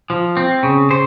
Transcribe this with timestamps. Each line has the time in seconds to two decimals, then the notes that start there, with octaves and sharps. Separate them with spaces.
0.10 F3
0.37 C4
0.63 C#3
0.90 C#3 C5